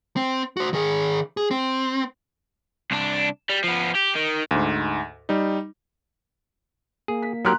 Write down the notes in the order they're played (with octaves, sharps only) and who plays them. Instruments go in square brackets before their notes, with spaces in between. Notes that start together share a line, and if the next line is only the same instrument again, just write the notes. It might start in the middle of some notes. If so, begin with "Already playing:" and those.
[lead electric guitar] C4
F#4 C5
D#3 G#4
G#4
C4
[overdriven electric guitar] C2 D4
G3
F3 B3
G4
D#3
[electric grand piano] D2 G#2
G3 D#4
[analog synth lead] A#3 [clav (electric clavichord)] G#4
[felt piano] B6
[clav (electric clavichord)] F#3 G4 A#4 [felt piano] A#5 C6 F#6